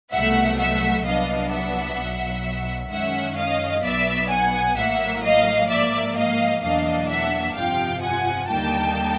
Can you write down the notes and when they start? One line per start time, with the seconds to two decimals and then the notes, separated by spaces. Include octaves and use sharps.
0.11 C2 B2 F#3 A3 E5 F#5
0.58 E5 F#5
1.05 C2 A#2 F#3 B3 D4 D#5 F5
1.52 E5 F#5
1.98 B1 B2 F#3
2.90 F#2 D#3 G#3 C#4 E5 F#5
3.37 D#5 F5
3.83 B1 B2 F#3 B3 D5 E5
4.30 F#5 G#5
4.76 A1 A2 F#3 A#3 E5 F#5
5.23 D#5 F5
5.69 G#2 F3 A#3 D5 E5
6.16 D#5 F5
6.61 E2 B2 F#3 A#3 D4 D#5 F5
7.08 E5 F#5
7.55 G1 F2 C3 F3 F5 G5
8.01 F#5 G#5
8.47 D#2 D3 G3 A#3 D#4 G5 A5